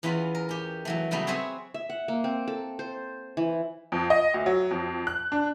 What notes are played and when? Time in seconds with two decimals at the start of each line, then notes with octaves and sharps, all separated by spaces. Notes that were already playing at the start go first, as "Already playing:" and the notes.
0.03 E2 E3 B3 C#4 F4 B5
0.35 A#4
0.49 C#4 G4
0.85 E3 F#3 A3
1.11 C#3 F#3 G3 A3 B3 C#4
1.27 C4 G#4 C#5 E5 F#5 G#5
1.74 E5
1.90 F#5
2.08 A#3
2.24 C4
2.48 A4
2.79 C5
3.37 E3
3.92 F2
4.10 D#5
4.34 D2
4.46 F#3
4.71 F2
5.07 F#6
5.32 D4